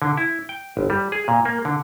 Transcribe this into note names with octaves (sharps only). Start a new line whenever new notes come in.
D3
E4
G5
G1
G3
G#4
A#2
A#3
D3